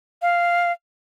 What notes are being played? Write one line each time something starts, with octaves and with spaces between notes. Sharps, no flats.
F5